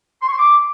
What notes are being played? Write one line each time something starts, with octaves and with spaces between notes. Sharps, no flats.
C6
C#6
C6
D6